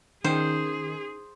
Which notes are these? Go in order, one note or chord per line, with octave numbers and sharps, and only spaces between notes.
D#3 C#4 D#4 G#4 C5 G5